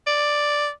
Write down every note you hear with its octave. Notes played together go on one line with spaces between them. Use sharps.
D5